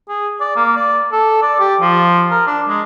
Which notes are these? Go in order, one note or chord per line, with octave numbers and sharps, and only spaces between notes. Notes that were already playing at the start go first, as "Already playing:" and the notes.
G#4
D5
A#3
D5
A4
D5
G4
F3
A#4
D4
G#3